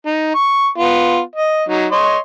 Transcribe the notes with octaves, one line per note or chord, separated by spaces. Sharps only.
D#4
C#6
B3 F4
D#5
F#3 D#4
C#5 D#5 C6